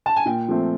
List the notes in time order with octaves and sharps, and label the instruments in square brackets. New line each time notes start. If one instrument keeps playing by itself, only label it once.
[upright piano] A5
G#5
A#2 G5
F3 A3 C4